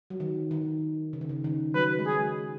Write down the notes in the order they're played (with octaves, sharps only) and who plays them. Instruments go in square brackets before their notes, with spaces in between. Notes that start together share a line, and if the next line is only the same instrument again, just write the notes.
[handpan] F#3
D#3
D#3
C#3
D#3
C#3
D#3
[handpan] F#3 [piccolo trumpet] B4
[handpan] G#3
[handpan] F#3 [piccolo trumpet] G#4